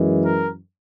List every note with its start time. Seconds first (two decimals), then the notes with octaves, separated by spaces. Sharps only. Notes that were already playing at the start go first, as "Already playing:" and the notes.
Already playing: F#2 E3 G#3
0.24 A#4